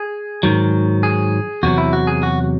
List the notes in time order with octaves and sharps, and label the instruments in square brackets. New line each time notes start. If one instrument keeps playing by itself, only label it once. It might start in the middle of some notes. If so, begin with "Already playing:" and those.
Already playing: [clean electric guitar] G#4
G#2 D#3 F#3
G#4
E2 C3 F#3 F#4
E4
F#4
G#4
F#4